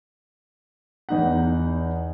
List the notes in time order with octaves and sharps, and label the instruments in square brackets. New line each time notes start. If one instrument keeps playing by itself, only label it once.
[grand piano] E2 D#4 F#5